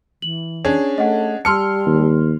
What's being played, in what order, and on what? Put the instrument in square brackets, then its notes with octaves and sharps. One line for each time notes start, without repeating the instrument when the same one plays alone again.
[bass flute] E3 [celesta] F#7
[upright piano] C#4 D4 G#4
[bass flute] A3 [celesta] D#5 F#5
[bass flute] G3 [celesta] A5 E6 [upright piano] C6 F6 C#7
[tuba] D#2